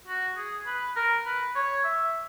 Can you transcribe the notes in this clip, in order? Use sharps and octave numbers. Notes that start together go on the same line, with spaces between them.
F#4
G#4
B4
A#4
B4
C#5
E5